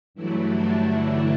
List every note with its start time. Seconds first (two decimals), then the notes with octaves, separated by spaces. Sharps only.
0.14 G2 E3 F#3 A3 E4
0.50 D3 D4